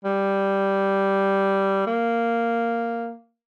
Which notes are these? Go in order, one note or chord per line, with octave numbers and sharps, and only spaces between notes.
G3
A#3